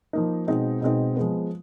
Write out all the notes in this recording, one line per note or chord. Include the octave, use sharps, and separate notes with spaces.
F3 A#3 D#4
B2 G#3 C4 D#4
B2 G#3 C4 D#4
F3 G#3 B3